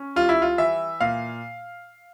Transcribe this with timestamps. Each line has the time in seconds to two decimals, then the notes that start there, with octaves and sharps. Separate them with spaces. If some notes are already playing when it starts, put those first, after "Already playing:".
Already playing: C#4
0.16 G3 F4
0.29 E4
0.42 F4
0.58 E3 E5
1.01 A#2 F5